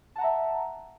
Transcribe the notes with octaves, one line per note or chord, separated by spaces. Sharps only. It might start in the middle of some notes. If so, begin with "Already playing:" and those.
E5 F#5 A5 A#5